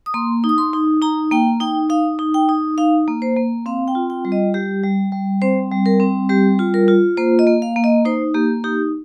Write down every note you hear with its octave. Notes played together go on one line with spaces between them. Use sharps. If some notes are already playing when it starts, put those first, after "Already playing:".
D#6
A#3 C6
D#4
D#6
C6
D#4
D#4 A#5
A#3 G5
D#4 G5
D#4 F5
D#4
G5
D#4
D#4 F5
A#3
C5
A#3
C4 F5
G5
F4
G5
G3
D#5
G3 G4
G3
G3
C4 C5
G3
A#4
C4
G3 G4
F4
A#4
F4
A#3 C5
D#5
A#3
F5
A#3
D#5
D#4 C5
A#3 G4
D#4 G4